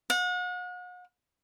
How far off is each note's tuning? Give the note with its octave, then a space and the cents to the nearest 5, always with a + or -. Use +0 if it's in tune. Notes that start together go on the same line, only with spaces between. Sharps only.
F#5 -40